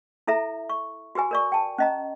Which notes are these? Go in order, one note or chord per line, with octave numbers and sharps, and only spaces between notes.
E4 A4 E5 A#5
C#6
F#4 G4 B4 G#5
A#4 D5 C#6
G5 A5
C#4 D#5 A#5